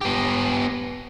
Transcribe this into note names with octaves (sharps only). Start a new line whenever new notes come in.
B3 G4